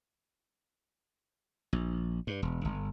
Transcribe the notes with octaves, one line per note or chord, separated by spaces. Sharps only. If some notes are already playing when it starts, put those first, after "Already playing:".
A#1
G2
E1
G1